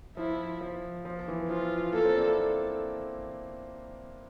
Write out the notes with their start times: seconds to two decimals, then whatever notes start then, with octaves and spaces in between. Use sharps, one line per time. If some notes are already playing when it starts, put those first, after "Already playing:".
0.17 F3 E4
0.61 F3
1.05 F3
1.28 E3
1.49 F3 F4
1.93 A#3 A4
2.05 C4
2.16 D4
2.27 E4